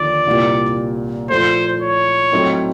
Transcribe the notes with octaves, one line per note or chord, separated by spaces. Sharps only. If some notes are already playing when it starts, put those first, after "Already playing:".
Already playing: D#2 D3 F3 D5
C2 A#2 G3 A#3
A#2 F3 A3 C5
C#5
A2 F#3 A3 C4 D#4